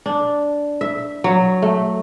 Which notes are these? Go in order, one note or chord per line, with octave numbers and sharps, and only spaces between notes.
D4
E5
F#3
A3